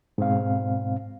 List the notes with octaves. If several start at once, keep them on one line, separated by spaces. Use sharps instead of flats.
G#2 B2 C4 F5